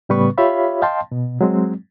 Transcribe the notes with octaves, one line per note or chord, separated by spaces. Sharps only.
A2 C#3 G3 B3 B4 C#6
F4 G4 C#5 E5 F5 B5
D#5 F5 G5 A5 C6
B2
F#3 G#3 C4